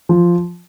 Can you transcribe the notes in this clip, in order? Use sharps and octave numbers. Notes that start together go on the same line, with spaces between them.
F3